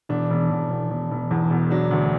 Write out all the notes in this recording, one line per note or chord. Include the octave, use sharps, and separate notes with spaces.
E1 D4
E1
E1
E1
E1
E1
E2
E1
F#3 D4
D2